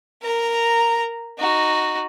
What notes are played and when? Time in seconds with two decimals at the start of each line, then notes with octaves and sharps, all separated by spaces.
0.22 A#4 A#5
1.38 D#4 F#4